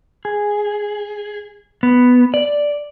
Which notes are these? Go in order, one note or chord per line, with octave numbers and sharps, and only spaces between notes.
G#4
B3
D5